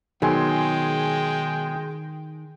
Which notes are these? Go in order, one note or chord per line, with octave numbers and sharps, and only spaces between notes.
B2 D#3 F#3 G#3 G#4 G5 G#5 C6